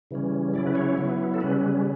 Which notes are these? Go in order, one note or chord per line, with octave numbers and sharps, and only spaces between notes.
C#3 E3 G3 C#4
C#3 F#3 C#4 E4 D5
B4
C#5
F#3 B3 E4
A4
C#3 G3 C#4 B4